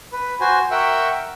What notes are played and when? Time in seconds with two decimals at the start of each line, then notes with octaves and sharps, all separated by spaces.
0.12 B4
0.41 F#4 C5 G#5
0.71 A#4 E5 F#5 G5 C#6 E6